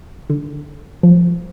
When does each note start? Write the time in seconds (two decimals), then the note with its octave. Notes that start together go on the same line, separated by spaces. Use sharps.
0.30 D3
1.03 F3